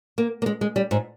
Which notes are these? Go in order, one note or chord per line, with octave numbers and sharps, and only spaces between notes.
A#3
A#3
G#3
G#3
G3
G#2